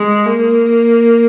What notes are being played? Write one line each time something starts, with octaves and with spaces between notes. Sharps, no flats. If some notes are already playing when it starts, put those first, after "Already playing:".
Already playing: G#3
A#3